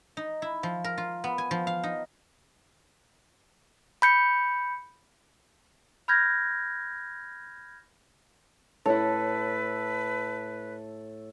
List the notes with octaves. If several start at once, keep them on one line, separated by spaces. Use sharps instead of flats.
D#4
E4
F3
A#4
F4
B3
G#5
F3
F5
D#4
B5 G6 C#7
B5 F6 G6 G#6 A#6
A2 E4 A4 B4 C#5